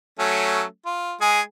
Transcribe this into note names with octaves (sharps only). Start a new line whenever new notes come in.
F#3 A3 C#4
F4
G#3 G#4